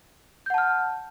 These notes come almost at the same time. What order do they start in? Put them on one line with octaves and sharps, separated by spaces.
G6 F#5 A5 F6